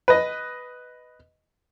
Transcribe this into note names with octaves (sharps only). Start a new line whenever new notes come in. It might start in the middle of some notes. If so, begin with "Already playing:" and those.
B4 D#5